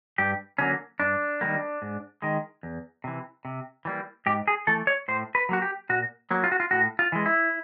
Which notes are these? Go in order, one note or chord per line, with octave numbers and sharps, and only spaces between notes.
G2 G4
D3 F#3 A#3 C#4
G2 D4
D#3 G3 A#3
G#2
D#3 G#3
E2
C3 E3
C3
E3 G3 A#3
G#2 G4
G#4
E3 A3 A4
C#5
A2 C5
B4
F#3 A#3 F#4
G4
A#2 F#4
F#3 A#3
F4
F#4
F4
A2 F#4
F4
E3 G#3
E4